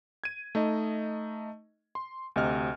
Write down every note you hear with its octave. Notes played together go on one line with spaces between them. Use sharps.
G#6 D#7
A3 D#4 D#5
C6
D2 C3 D#5 F6